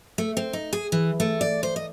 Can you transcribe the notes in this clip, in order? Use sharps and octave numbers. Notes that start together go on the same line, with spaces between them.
A3
C4
D#4
G#4
E3
A3
D5
C5
D#5